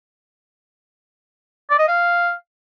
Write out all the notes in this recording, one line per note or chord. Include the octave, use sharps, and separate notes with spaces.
D5
D#5
F5